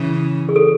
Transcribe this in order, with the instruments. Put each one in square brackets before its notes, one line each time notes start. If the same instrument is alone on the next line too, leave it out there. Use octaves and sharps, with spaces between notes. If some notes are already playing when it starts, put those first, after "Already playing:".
Already playing: [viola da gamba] C#3 E3
[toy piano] G#4
A4